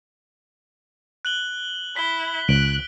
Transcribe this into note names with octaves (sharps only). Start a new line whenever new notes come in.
F#6 F#7 G7
E4 B6 G7
C#2 F#6 D7